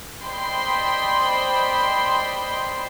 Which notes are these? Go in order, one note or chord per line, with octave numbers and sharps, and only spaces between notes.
C5 D5 D#5 G5 B5 C6